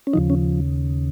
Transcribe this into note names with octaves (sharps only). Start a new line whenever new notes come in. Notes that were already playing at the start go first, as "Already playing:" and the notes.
C#4
D#2 C#3 F3 D#4
C#4